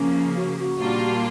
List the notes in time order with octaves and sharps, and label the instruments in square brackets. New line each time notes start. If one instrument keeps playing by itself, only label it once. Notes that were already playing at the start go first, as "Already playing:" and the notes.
Already playing: [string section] C#3 F3 A#3 [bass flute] C#4
[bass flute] F#4
F#4
[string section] A#2 G3 A#3 D4 F4